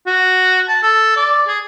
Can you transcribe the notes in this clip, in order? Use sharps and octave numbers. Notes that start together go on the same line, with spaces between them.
F#4
A5
A4
D5
G#4